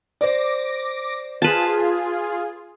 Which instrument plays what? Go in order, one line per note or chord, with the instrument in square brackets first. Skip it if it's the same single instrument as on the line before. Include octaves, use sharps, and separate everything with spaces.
[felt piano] C5 D5 [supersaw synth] D6 A#6
[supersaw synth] F4 G#4 [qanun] B4 A5